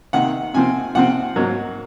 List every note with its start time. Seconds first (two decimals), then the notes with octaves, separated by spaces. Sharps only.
0.13 C3 D#3 A#3 F#5
0.54 C3 F3 C4 G#5
0.95 C3 F3 C4 F#5
1.36 G#2 F#3 A#3